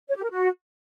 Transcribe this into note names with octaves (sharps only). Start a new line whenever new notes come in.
C#5
G4
A#4
F#4